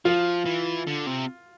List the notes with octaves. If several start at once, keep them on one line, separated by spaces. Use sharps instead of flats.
F3 F4
E3
D3
C3